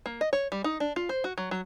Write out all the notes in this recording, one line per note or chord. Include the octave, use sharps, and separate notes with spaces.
A#3
D#5
C#5
G3
D#4
D4
F4
C5
F#4
F#3
F#3